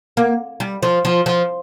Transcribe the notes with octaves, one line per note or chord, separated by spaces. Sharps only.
A#3
G3
F3
F3
F3